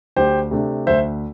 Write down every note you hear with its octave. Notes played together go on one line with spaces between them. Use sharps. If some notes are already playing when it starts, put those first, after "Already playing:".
D2 G4 C5
C3 A3 D4
D2 C5 E5